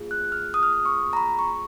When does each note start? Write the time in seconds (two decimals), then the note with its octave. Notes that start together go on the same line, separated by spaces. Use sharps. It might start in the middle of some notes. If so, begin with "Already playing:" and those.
Already playing: A#3 F4 G#4
0.11 F#6
0.32 F6
0.54 D#6
0.63 F6
0.73 D#6
0.86 C#6
1.13 A#5
1.17 B5
1.39 C#6